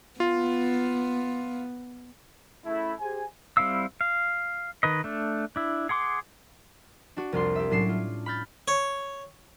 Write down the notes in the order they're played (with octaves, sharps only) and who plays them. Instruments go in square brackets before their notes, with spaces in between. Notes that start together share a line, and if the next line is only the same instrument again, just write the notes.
[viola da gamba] B3 [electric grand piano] F4
[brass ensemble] C#3 A3 E4
G4 G#4 C5 G#5
[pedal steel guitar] G3 C4 E4 F5 E6
F5
D#3 B4 D#5
A3 D4
D4 E4
G#4 F#5 C6 D6
[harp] D4 F#4
C2 F2 D4 C6
G4 E5
A2 F#3 C#4 D4 C7 E7
F4
B5 F6 G6 A6
[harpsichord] C#5